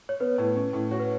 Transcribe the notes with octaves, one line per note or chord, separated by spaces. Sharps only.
C#5
B3 B4
A2
C#4
A2
F#4 C#5
B4